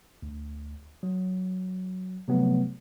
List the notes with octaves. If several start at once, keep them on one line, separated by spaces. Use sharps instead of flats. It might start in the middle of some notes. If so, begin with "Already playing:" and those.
D2
F#3
C3 F3 F#3 A3 B3